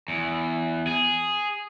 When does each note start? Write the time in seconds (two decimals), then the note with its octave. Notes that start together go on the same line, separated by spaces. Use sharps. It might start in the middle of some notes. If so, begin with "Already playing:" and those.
0.08 E2
0.87 G#4